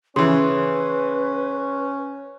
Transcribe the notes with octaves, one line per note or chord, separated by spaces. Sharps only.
C#3 E3 C#4 B4 C6